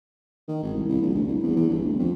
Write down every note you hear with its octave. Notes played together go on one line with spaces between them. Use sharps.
D#3
G#1
C2
C2
A#1
D2
C2
E2
E2
G1
D2
F2